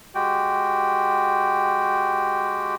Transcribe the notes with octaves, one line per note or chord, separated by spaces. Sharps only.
G#3 F#4 G4 G5